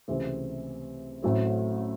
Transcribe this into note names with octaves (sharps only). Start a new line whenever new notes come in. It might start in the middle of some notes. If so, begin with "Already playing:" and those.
C#2 C3 E3 A3 C4
A1 A2 F#3 A3 C4